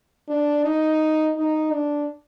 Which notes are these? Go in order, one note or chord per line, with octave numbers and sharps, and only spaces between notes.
D4
D#4
D#4
D4